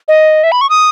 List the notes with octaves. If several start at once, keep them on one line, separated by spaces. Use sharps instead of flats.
D#5
E5
B5
C#6
D#6